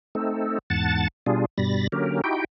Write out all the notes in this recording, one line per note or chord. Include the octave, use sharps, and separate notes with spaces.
A3 C4 D#4 A4
E2 G#2 F#5 A5 A6
B2 G3 D4 F4 G#4
G2 B2 G3 B5 A6 A#6
D3 F#3 A#3 C#4 G4 A#4
D#4 E4 F#4 G4 G5